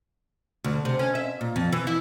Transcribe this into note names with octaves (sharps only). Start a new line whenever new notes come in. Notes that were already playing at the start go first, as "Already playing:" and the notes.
D2
C3
C#4
E5
A#2
F2
E3
E4